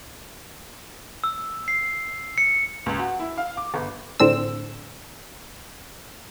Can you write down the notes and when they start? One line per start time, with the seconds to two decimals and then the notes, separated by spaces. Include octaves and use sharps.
1.24 E6
1.68 C7
2.38 C#7
2.86 C#2
2.99 F#4
3.19 E4
3.37 F5
3.57 D6
3.74 G1
4.20 A2 D3 C4 D4 E6